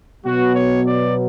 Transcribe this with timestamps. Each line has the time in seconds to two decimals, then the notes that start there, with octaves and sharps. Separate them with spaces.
0.24 B2 F#3 B3 F#4
0.55 C#5
0.86 D5